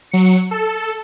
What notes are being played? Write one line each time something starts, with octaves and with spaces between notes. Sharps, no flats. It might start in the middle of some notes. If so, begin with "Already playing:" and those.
F#3 C#7
A4